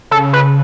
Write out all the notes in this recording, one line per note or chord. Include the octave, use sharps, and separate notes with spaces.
C#3 A4
B4